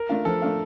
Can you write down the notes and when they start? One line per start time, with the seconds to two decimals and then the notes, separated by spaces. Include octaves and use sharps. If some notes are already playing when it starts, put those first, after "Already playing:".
Already playing: A#4
0.09 A3 D4 F4
0.25 F3 A4
0.42 A3 D4 F4